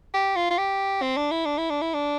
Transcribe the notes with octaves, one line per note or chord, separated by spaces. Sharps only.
G4
F4
F4
G4
C4
D4
E4
D4
E4
D4
E4
D4